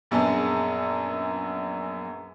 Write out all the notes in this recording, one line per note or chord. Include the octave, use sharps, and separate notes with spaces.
A#1 F#2 B3 G#4 A5